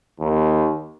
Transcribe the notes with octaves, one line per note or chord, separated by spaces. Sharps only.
D#2